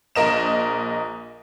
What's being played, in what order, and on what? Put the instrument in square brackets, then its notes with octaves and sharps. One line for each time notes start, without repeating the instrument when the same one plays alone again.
[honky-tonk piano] A#1 A#4 D#5 E7